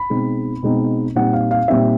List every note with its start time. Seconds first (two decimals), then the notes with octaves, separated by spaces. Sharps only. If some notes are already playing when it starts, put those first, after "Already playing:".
Already playing: B5
0.10 B2 G#3 C4 D#4
0.63 B2 G#3 C4 D#4
1.15 A#2 G3 C4 D#4 F#5
1.33 F5
1.51 F5
1.68 A#2 G3 C4 D#4 E5